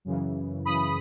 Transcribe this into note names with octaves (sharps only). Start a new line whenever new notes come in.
F#2 C#3 E3
F#2 C#3 E3 B5 D#6